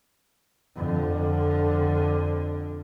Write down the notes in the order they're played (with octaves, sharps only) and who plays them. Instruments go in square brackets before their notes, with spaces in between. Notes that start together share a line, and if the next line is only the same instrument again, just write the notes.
[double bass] F2 D3